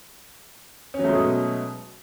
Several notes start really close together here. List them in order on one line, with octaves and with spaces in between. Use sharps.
C#4 F#3 A3 G#3 B2